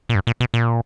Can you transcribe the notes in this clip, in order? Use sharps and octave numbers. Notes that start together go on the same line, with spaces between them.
A#2
G2
A#2
B2
A#2